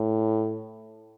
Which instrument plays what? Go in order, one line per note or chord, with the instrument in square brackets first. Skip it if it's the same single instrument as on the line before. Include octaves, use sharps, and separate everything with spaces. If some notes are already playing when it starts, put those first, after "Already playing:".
Already playing: [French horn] A2